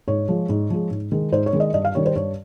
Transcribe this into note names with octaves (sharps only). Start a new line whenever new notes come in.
G#2 C#5
F3 G#3
G#2
F3 G#3
G#2
D#3 G#3
G#2 C5
C#5
D#3 G#3
D#5
G2 D#5
F5
D#3 G3 C#5
C5
G2 C#5